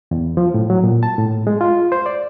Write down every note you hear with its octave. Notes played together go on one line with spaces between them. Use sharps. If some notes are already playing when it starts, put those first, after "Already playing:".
E2
F3
A2
F#3
A#2
A5
A2
G#3
F4
C5
D5